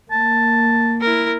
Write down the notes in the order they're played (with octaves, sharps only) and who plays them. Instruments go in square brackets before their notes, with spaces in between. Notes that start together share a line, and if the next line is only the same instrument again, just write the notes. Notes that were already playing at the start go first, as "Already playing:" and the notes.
[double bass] A#3 [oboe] A5
[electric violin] E4 A#4